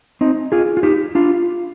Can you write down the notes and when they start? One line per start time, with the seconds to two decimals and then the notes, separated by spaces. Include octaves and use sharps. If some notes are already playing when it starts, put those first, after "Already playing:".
0.21 C4 D#4
0.52 F4 G#4
0.77 F4
0.83 D#4 G4
1.15 D4 F4